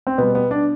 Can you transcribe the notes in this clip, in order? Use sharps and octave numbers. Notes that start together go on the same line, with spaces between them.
C4
B2 G3 B3
B3
D4